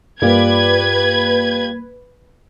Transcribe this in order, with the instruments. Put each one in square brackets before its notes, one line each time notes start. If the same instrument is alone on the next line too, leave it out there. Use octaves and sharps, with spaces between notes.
[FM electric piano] G2 A#3 [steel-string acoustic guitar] F4 G4 D5 [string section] B4 G#6